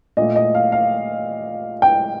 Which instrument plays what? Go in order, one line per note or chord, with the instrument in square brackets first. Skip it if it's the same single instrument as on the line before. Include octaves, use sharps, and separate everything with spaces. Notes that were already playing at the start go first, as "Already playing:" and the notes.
[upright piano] A#2 A3 D#5
D#5
F5
F5
G5